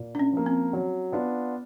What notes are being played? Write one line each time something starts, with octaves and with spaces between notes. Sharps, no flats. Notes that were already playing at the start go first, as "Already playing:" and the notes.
Already playing: A#2
D4
C#4
F3 A#3
C4
F#3
B3 D4 F4